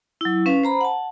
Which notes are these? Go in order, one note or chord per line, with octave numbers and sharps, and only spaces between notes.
F#3 E4
C#4 B4 F5
C5 A#5 B5
F#5 A5